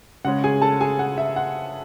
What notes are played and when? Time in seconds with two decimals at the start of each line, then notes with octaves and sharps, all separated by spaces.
0.25 C#3 G#3 C#4 F#5
0.44 G#4 G#5
0.62 A4 A5
0.81 G#4 G#5
0.99 F#5
1.18 E5
1.36 F#5